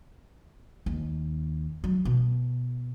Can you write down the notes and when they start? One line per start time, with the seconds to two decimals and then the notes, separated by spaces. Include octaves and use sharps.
0.86 D#2
1.84 F#3
2.05 B2